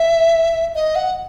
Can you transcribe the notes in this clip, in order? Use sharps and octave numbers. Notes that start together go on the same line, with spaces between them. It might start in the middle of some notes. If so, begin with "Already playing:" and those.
Already playing: E5
D#5
F#5